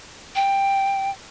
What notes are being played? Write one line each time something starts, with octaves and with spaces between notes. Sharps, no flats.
G5